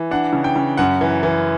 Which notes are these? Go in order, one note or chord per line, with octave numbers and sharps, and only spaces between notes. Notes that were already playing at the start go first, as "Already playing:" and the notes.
Already playing: E3
D4 F#5
C#3
G5
C#3
F#2 F#5
E3
E3